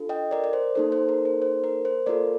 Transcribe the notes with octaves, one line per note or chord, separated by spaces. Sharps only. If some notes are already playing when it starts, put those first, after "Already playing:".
Already playing: D4 F4 A4
D#5 G5
A#4 D5
D5
C5
A#3 D#4 A4 C5
C5
A#4
C5
C5
A#4
C5
A#3 F4 A4 A#4 D5